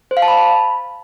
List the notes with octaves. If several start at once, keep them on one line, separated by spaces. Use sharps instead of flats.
C5
F5
A5
B5